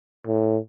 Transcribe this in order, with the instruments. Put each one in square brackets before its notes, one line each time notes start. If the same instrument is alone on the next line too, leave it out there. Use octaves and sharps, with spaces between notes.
[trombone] A2